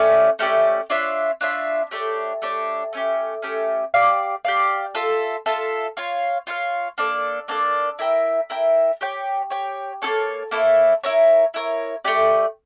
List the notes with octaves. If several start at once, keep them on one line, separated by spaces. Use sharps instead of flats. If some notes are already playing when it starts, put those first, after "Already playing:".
Already playing: A3 C#4 G4 D5
A3 C#4 G4 D5
D4 F4 C#5 E5
D4 F4 C#5 E5
A3 D4 G4 C#5
A3 D4 G4 C#5
A3 C#4 G4
A3 C#4 G4
G4 D5 F5
G4 D5 F5
F4 A4 E5
F4 A4 E5
F4 C#5 F5
F4 C#5 F5
A#3 D4 A4 D5
A#3 D4 A4 D5
E4 A#4 E5 G5
E4 A#4 E5 G5
G4 C#5 G5
G4 C#5 G5
A#3 E4 A4 C#5
A#3 E4 A4 C#5
E4 A#4 C#5
E4 A#4 C#5
A3 E4 G4 D5